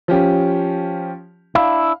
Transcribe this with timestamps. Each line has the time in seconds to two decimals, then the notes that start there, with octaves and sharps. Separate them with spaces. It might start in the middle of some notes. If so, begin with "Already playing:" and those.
0.08 F3 C#4 G4
1.55 D4 E4 F5